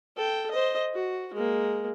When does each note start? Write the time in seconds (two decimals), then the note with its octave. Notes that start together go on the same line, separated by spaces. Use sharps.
0.16 A4 G5
0.51 C5 D#5
0.94 F#4
1.33 G#3 A#3